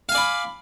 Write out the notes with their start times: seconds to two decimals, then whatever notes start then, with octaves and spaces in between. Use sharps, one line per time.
0.09 F5
0.12 G#5
0.15 D5
0.18 B5